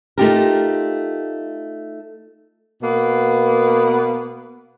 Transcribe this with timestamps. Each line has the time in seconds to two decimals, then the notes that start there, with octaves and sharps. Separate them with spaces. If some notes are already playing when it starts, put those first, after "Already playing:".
0.18 A3 D#4 F4 G4 A4 A#4
2.82 B2 A#3 B3